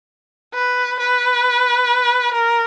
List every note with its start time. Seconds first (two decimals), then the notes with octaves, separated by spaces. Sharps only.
0.54 B4
0.99 B4
2.33 A#4